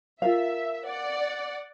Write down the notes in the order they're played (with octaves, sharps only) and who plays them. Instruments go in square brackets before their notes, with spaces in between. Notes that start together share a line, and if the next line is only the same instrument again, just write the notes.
[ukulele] F4 A#4 F5 [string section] E5
[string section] D5 F#5